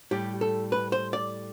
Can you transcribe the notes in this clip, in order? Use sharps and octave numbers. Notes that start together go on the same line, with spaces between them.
A2 G3 G4
A4
B4
C5
D5